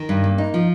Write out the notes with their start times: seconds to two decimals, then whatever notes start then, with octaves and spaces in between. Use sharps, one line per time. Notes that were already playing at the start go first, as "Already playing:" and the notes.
Already playing: D#3
0.09 G2
0.24 A#3
0.38 D#4
0.54 F3